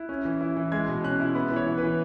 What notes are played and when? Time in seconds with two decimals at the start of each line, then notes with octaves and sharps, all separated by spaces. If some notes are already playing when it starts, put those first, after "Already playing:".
Already playing: E4 F#6
0.09 C#4
0.25 E3
0.41 E4
0.56 E3
0.72 G#3 G#6
0.88 B2
1.04 C#4 F#6
1.20 E4
1.35 B3 B5
1.52 E3 C#5
1.67 E4
1.78 B4
1.83 E3